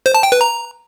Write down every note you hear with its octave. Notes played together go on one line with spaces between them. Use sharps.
C5
A5
G5
B4
A#5